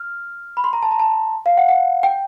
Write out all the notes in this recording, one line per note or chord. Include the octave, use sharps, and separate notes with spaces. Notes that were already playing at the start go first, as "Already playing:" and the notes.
Already playing: F6
B5
C6
A#5
A5
A#5
A5
F5
F#5
F#5
G5